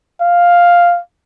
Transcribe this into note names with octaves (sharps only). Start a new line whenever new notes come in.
F5